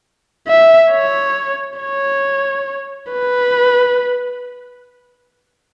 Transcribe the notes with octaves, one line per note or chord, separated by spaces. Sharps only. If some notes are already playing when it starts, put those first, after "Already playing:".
E5
C#5
C#5
B4